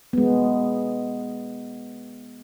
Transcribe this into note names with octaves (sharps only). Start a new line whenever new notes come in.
G#3 B3